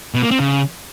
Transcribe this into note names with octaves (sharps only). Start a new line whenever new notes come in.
B2
A#3
C4
C#3